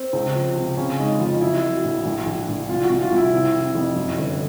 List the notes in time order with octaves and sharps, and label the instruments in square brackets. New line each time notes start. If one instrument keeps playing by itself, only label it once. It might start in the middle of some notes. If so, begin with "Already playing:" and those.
Already playing: [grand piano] C4
[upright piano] C#2
F3
C3
[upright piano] C#3 [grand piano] C#4
[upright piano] G#3 [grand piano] D#4
[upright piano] F2 [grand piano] F4
[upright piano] F#3 [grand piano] E4
[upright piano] F#3
A#1
A#1
A#1
A#1
[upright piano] C2 [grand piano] F4
[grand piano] F#4
[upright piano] C2
[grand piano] F4
[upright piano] C2 [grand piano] E4
[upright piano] C3
F1
F2
F#2
G1